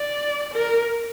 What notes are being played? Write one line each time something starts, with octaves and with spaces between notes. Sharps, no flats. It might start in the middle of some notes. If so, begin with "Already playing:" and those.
Already playing: D5
A#4